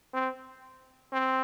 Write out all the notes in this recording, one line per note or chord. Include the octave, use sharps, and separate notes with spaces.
C4
C4